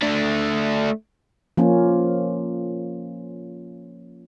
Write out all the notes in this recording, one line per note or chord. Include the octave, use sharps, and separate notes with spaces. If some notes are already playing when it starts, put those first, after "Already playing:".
A3 D4
F3 A#3 C#4 F4